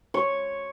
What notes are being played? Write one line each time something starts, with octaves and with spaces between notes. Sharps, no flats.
C#5